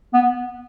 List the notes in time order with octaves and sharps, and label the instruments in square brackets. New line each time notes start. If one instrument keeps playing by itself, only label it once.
[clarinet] B3